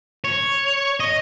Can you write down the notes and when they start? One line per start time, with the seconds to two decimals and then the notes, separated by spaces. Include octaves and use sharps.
0.24 C#5
1.00 D#5